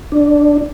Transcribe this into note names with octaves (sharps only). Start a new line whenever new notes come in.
D4